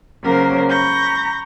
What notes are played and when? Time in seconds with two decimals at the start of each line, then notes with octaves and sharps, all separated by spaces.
0.23 C#3 F#3 A#3 A#4 C5
0.69 A#5 B5 C#6 G6 A#6